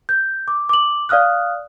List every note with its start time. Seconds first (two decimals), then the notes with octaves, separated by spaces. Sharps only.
0.09 G6
0.48 D6
0.69 D6 F#7
1.09 D5 F5 D#6 F6 F#6